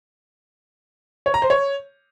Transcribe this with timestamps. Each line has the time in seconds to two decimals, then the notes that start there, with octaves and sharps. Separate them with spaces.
1.26 C#5
1.34 A#5
1.42 C5
1.50 C#5